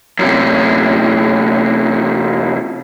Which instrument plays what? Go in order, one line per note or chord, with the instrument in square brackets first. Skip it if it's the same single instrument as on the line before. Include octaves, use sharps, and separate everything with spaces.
[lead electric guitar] F#2 C3